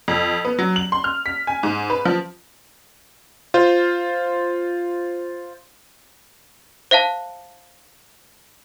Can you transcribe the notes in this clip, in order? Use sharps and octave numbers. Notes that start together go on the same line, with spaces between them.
F2
B3
F#3
F#7
C6
F6
B6
G#5
G#2
B4
F3
F4 C5
C5 E5 F5 A5